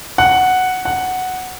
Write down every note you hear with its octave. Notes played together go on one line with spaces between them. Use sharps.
F#5
F#5